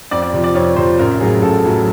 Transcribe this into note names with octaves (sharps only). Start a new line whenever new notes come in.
F2 D5
D5
C3 F3
D5
F2 C#5
C3 F3 C5
A1 A#4
A2 F#3 G#4
A1 A4
A2 F#3